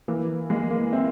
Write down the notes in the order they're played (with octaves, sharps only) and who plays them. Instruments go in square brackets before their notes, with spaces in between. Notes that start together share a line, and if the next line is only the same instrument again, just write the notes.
[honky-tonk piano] E3 [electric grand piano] A#3
[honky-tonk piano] G#3 [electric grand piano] A#3
[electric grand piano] A#3
[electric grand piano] C4 [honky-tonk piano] E4